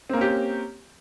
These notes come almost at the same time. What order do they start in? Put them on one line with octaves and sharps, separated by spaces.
C4 A#3 C#4 G4